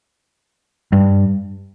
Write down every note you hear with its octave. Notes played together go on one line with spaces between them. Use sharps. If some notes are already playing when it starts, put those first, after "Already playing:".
G2